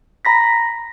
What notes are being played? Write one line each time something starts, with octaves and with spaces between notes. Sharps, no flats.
A#5 B5 A#6 B6